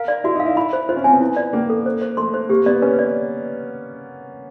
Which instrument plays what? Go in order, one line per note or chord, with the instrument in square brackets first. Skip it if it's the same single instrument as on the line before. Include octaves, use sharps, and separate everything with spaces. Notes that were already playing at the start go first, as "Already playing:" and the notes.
Already playing: [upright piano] A#4 [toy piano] F5
[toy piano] D5
[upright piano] E4 [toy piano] F#4
[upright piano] D#4
[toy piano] F5
[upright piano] E4
[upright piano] E4 [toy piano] B5
[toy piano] C5
[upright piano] F4 [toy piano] C5
[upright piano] C#4
[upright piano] C4 [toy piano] G#5
[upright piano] B3
[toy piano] E4
D5
[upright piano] A#3 [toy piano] C#4
[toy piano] A4
C5
C5
[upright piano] A3 [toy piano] C6
[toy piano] C5
[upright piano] A#3 [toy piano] G4
[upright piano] B3 [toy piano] D5
[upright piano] C#4 [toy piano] B4
[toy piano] D5